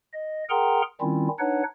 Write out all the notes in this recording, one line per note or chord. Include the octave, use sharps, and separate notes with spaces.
D#5
G#4 A#4 F#5 G5 A#5 C6
D#3 G3 C4 C#4 E4 F4
D4 D#4 B4 C#5 F#5